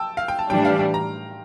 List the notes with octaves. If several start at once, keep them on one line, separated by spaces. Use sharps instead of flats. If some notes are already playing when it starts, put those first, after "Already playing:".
Already playing: G5 A5 E6
F5
G5
A5
A2 E3 G3 D4 G5
F5
G5
A#5